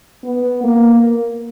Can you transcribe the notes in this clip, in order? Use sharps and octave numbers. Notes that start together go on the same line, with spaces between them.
B3
A#3